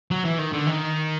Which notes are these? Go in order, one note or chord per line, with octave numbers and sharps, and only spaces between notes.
F#3
E3
D#3
D3
D#3